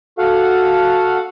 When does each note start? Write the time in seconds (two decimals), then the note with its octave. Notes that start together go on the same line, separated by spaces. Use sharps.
0.18 F#4 A4 F5 F#5